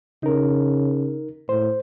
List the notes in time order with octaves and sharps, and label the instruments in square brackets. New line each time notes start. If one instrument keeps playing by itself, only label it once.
[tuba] C#3 [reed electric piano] D#4 A#4
[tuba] A2 [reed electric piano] C5